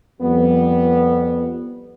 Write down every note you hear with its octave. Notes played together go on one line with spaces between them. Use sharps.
F2 G3 B3